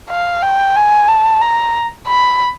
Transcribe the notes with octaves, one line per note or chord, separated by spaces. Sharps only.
F5
G5
G#5
A5
A#5
B5